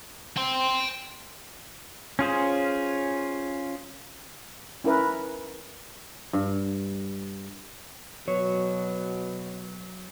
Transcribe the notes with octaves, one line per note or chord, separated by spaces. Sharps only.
G5 C6
C#4 F4 G#4 C5
C#4 E4 A#4 B4
G2
B2 F#3 C#5